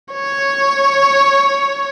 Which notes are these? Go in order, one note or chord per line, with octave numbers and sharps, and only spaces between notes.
C#5